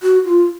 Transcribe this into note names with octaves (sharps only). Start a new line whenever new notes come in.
F#4
F4